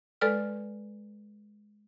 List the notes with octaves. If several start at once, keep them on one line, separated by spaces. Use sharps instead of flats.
G#3 A4 B4 D5 F6